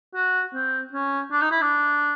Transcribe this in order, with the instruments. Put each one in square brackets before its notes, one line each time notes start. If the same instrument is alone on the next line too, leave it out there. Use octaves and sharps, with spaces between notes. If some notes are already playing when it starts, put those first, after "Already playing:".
[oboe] F#4
C4
C#4
D4
D#4
E4
D4